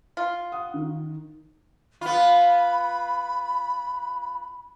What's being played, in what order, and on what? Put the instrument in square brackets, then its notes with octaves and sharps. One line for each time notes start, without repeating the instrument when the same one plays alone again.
[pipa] F4
[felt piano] F#5 D#6
D#3
[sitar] B3 F4 [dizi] B5